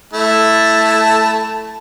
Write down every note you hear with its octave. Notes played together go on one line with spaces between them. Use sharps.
A3 E4 A5